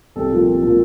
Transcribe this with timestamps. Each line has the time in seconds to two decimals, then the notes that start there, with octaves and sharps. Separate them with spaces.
0.16 C2 A4
0.32 A#2 F3
0.47 C2
0.63 A#2 F3